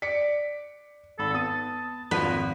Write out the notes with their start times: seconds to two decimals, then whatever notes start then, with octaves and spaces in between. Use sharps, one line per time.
0.02 D5 B6 C#7
1.19 G#1 A4 B5
1.34 B3 A5 D#6 D#7
2.11 G#1 F2 F3 A#3 B4